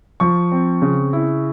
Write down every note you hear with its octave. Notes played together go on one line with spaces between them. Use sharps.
F3 C#6
C4
C#3
E4